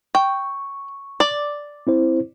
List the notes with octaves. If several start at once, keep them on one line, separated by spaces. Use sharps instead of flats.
G5 C#6
D5
C4 E4 C5